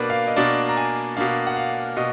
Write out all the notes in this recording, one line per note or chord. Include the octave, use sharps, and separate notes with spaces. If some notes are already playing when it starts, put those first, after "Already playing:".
Already playing: B2 A#3 D4 A#4 B4 D5
F5
D#5
B2 A#3 D4 D5
A#5
G#5
B2 A#3 D4 F5
F#5
F5
B2 D#5